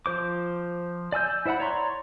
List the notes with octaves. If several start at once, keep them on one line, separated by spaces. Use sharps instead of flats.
F3 C5 D6
D5 G#5 E6 G6
E4 C5 E5 F#5 B5
C#5 D5 A#5 C6 C#6